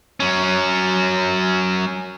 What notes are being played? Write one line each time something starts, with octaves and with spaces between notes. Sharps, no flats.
F#3 C#4